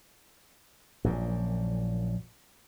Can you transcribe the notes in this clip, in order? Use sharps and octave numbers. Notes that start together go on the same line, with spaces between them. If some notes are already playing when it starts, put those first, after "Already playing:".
A#1 F#2 A#2